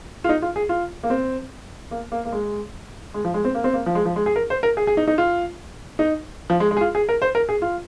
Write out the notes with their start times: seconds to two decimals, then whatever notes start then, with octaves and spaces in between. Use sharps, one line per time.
0.24 F4
0.29 D#4
0.42 F4
0.56 G#4
0.69 F4
1.03 A#3
1.10 C4
1.91 A#3
2.12 A#3
2.25 A#3
2.32 G#3
3.14 G#3
3.25 F3
3.34 G#3
3.45 C4
3.55 A#3
3.64 C4
3.74 A#3
3.86 F3
3.95 G#3
4.05 F3
4.16 G#3
4.26 G#4
4.36 A#4
4.50 C5
4.63 A#4
4.77 G#4
4.87 G#4
4.97 D#4
5.08 D#4
5.18 F4
5.99 D#4
6.50 F3
6.60 G#3
6.71 G#3
6.77 G#4
6.81 F4
6.95 G#4
7.09 A#4
7.22 C5
7.35 A#4
7.49 G#4
7.62 F4